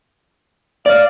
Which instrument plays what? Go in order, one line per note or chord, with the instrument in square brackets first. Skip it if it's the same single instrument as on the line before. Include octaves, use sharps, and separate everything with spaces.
[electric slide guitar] D5 [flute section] F5 F6